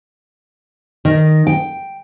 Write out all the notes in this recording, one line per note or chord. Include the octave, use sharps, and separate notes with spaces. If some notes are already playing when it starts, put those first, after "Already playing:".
D#3
G5